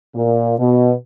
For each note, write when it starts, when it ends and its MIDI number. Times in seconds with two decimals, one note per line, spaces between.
0.15 0.57 46
0.58 0.93 47